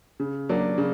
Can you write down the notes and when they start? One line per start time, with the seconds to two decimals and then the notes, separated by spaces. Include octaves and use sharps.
0.20 C#3
0.49 F#3 A#3 D4
0.78 C#3